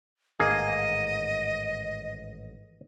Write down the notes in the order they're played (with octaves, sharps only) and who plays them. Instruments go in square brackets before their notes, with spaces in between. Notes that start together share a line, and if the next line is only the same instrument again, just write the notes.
[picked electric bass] A1 G#2 D#3 [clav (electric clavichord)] A#3 G#4 [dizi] D#5